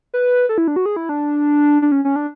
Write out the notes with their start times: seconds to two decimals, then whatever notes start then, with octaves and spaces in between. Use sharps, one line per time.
0.14 B4
0.49 A4
0.58 E4
0.68 D4
0.76 F#4
0.86 G#4
0.96 E4
1.09 D4
1.82 D4
1.92 C#4
2.05 C#4
2.16 D4